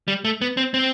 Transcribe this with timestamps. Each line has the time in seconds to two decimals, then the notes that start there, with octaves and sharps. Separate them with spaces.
0.08 G3
0.25 A3
0.41 B3
0.57 C4
0.74 C4